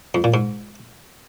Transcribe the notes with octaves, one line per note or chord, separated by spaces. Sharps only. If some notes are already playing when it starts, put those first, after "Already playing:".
F2
A#2
G#2